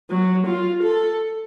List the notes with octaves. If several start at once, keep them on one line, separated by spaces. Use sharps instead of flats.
F#3
F4
A4